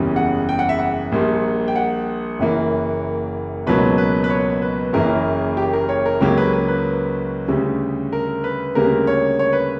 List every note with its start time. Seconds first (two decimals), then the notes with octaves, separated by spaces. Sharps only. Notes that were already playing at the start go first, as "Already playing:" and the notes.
Already playing: F#1 E2 C#3 G3
0.16 F#5
0.49 G5
0.59 F#5
0.69 E5
0.79 F#5
1.12 A#1 A#2 G3 A#3
1.68 G5
1.76 F#5
2.39 F#1 F#2 E3 A#3
3.67 C#2 B2 F#3 A#3 B4
3.98 B4
4.24 B4
4.30 C#5
4.62 B4
4.93 F#1 F#2 C#3 E3 A#3 A#4
5.57 G4
5.73 A#4
5.89 C#5
6.06 A#4
6.21 C#2 C#3 F#3 A#3 G4
6.38 B4
6.54 B4
6.68 B4
7.48 D2 C#3 G3
8.13 A#4
8.44 B4
8.75 D2 C#3 G3 A#3 A#4
9.07 C#5
9.39 C#5
9.53 B4